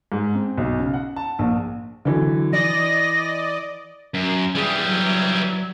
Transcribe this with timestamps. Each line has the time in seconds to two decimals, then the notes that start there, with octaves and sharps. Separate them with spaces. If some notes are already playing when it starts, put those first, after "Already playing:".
0.12 G#2
0.35 C4
0.58 B1
0.79 C#3
0.94 F#5
1.16 A5
1.39 A#1
2.05 D3 E3 F#3
2.53 E3 D5 D#5 A#6
4.14 F#2
4.55 E3 G3 G#4
4.85 F#3